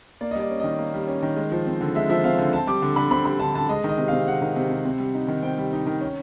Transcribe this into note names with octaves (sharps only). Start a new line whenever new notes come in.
A#3 D5
D#5
G3 D5
C#4
D#3 D#5
A#3
G3
C#4
D#3
G#3
F3
C4
D3
G#3 E5
F3 E5
C4 F5
D3
C4 A5
G3 D6
D3
D3 B5
C4 B5
G3 B5
D3 A5
D3 A5
G#3 D#5
D#3
D#5
C3
C3 F5
G#3 F#5
D#3
C3
C3
C4
G3
D#4
D#3
C4 G5
G3
D#4
D#3
C#4